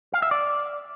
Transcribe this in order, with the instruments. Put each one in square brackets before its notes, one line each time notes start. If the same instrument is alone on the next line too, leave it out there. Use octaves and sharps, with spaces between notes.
[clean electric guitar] F5
E5
D5